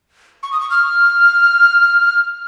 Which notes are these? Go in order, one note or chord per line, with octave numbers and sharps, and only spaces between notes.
C#6
D#6
C#6
F6